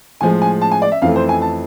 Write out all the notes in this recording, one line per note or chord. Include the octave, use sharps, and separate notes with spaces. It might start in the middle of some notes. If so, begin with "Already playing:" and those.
A2 F3 G#3 G#5
G#5
A5
G#5
D5
E5
F2 E3 A3 F5
C5
G#5
A5